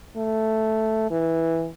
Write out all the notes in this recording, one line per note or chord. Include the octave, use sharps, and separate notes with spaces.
A3
E3